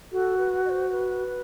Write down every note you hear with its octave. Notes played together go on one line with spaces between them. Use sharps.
F#4 A4
B4
D#5
C5
B4